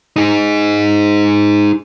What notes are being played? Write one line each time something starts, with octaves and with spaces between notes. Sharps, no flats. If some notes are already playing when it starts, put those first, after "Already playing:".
D#4 G#4